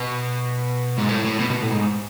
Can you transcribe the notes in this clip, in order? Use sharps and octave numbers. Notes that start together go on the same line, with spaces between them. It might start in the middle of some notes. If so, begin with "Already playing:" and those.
Already playing: B2
G#2
A2
A2
B2
B2
A2
G#2